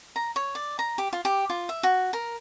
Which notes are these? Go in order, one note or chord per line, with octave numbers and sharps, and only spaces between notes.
A#5
C#5
D5
A#5
G4
F4
G4
F4
E5
F#4
A#4